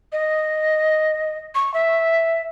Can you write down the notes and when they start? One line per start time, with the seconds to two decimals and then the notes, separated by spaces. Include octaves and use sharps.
0.12 D#5
1.55 C#6
1.74 E5